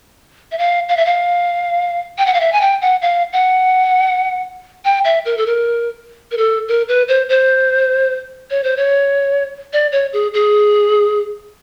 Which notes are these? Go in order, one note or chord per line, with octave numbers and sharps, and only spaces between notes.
E5
F5
F5
E5
F5
G5
F#5
F5
E5
G#5
G5
F#5
F5
F#5
G5
E5
A#4
A4
A#4
A#4
A4
A#4
B4
C5
C5
C#5
C5
C#5
D5
C#5
G#4
G#4